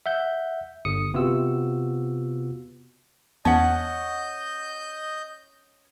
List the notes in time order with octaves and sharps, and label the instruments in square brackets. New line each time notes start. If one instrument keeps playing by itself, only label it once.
[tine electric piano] E5 F#5 G6
G1 D#6 C#7
C3 B3 F4 F#4 E6
[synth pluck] E2 A5 [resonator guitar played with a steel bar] C#4 F#5 [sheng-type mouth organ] D#5 G6